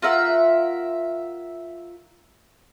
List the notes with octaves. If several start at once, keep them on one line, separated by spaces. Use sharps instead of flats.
F4 A#4 E5 F#5